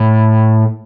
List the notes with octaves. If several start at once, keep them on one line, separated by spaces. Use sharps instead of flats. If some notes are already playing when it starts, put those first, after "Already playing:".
Already playing: A2